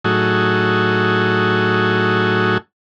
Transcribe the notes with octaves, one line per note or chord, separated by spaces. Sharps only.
A2 F#3 D#4 F#4 G#4 A4